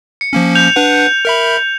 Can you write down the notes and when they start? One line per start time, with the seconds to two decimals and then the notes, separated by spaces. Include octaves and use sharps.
0.21 C#7
0.33 F3 A#3 C#4
0.55 G6 F7
0.76 D4 B4 F#5
1.25 A#4 E5 B5